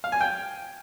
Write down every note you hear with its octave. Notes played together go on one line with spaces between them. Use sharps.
F5
G#5
G5